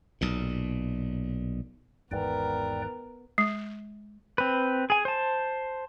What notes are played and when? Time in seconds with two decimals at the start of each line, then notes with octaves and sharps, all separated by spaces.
0.21 B1 A#2
2.11 G#1 E2 G#2 B3 A#4 B4 D5 G5
3.38 G#3
4.38 C4 B4
4.90 G#4 G#5
5.05 C5 A5